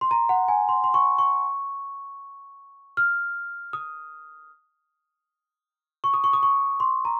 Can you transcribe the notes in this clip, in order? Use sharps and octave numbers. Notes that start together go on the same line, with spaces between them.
C6
A#5
F#5
G#5
C6
C6
C#6
C#6
F6
D#6
C#6
D#6
C#6
D#6
C#6
C6
A#5